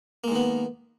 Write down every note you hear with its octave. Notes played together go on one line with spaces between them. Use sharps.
D#3 G#3 A#3 B3